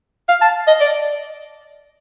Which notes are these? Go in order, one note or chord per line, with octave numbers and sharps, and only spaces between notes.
F5
A5
D#5
D5